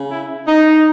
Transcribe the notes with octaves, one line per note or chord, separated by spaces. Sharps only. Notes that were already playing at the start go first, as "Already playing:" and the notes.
Already playing: C#3
E4
D#4